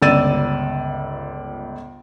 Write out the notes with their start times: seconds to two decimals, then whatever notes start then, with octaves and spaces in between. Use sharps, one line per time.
0.02 G1 C#2 D5 E6 A6 D#7